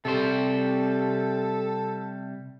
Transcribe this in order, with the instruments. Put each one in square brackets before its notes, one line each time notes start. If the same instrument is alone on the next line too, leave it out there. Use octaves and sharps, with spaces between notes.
[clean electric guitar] C3 G3 C5 [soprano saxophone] A4